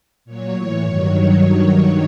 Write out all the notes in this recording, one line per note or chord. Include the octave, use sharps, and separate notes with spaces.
A#2 F#3 C#5
A2
E3
G2 D#3 F#3